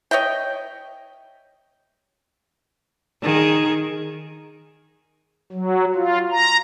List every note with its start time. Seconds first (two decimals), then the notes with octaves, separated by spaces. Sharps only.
0.11 C#5 D#5 E5 G5
3.22 D#3 G#4
5.52 F#3
5.95 F4
6.31 A#5